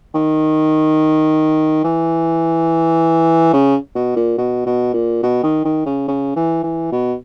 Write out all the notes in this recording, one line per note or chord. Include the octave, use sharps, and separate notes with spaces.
D#3
E3
C#3
B2
A#2
B2
B2
A#2
B2
D#3
D#3
C#3
C#3
E3
E3
B2